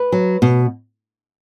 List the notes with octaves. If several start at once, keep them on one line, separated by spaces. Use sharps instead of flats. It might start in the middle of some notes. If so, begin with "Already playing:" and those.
Already playing: B4
F#3
B2